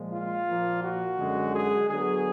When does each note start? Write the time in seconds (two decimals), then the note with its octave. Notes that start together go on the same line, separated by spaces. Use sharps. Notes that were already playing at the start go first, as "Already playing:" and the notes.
Already playing: A#2 F3 G#3
0.13 F4
0.48 A#2 F3 A#3
0.84 F#4
1.19 F#2 D3 G#3
1.55 G#4
1.89 D3 F#3 B3 G#4